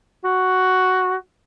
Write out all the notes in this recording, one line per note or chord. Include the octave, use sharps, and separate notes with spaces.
F#4